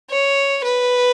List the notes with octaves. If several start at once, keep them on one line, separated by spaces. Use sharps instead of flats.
C#5
B4